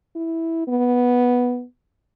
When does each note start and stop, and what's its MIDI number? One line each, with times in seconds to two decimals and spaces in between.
0.16 0.64 64
0.68 1.64 59